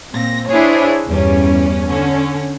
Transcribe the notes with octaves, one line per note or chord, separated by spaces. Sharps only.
A#2 C4 A#6
D4 E4 G#4 C5 C#5
E2 G2 G3 C#4
D3 C#4